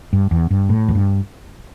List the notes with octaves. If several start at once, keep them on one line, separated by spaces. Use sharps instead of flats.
G2
E2
G2
A2
E2
G2